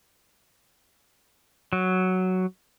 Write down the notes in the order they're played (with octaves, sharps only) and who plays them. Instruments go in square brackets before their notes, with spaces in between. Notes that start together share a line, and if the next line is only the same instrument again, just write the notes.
[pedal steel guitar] F#3